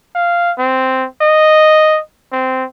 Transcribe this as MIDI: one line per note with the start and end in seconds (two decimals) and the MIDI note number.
0.15 0.52 77
0.58 1.05 60
1.21 1.99 75
2.32 2.64 60